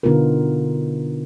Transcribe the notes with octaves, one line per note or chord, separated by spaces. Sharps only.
B2 D3 B3 D#4 F4 A#4